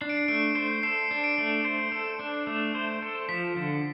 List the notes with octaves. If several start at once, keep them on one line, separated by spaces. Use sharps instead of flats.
D4 C7
D7
C7
A3 D7
C5 C7
A4 C7
D4
D7
A3
C5 C7
A4
D4
A3
C5
A4
F3 B6
D3